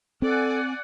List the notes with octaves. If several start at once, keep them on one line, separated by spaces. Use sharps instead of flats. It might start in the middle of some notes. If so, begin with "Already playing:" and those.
C4 A4 D5 F#5 G#5